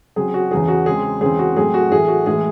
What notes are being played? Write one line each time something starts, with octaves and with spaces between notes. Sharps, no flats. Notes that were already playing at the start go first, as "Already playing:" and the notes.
C#3 F#3 C4 G#4
F#4
E2 C#3 E3 G#4
F#4
C#3 G#3 C4 G#4
E2 C#3 G#3 C4 G#4
F#4
A2 F#3 A3 C4 G#4
F#4
A2 E3 A3 G#4
F#4
A2 E3 G#3 G#4